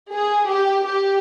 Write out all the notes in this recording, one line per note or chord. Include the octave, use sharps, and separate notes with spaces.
G#4
G4
G4